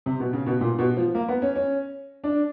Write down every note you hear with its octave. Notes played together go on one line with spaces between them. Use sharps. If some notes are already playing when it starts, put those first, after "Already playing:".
C3
B2
C#3
B2
A#2
B2
F3
A#3
B3
C#4
C#4
D4